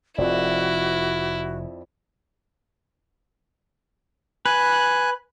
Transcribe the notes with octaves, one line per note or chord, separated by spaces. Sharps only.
F1 F2 E4 F#4 D5
B4 G#5 F#6